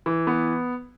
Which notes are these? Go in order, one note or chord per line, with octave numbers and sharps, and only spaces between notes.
E3
B3